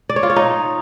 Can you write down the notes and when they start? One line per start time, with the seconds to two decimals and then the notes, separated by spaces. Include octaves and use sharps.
0.09 D5
0.16 C#5
0.23 F4
0.30 C#5
0.36 D#4